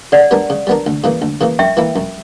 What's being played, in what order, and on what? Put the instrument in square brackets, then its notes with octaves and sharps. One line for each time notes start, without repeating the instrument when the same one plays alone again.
[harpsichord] C#3 [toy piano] D5 F#5
[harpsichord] G3 B3 D4 A#4
C#3
G3 B3 D4 A#4
D2
C#3 E3 A#3
D2
C#3 E3 A#3
[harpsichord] F#2 [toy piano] E5 G5
[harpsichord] E3 A#3 E4
F#2